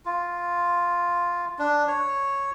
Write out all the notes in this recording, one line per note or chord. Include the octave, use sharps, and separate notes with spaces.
F4
D4
C#5